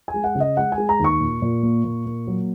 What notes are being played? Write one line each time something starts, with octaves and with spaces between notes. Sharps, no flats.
G#5
G#3
F#5
C#3
D#5
G#3 F#5
G#5
G#3
A#5
D#2
C#6
A#2
A#2
A#3
A#2
A#3
F#3